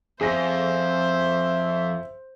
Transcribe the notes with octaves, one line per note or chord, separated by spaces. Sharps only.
F2 G#4 C5 E5 A#6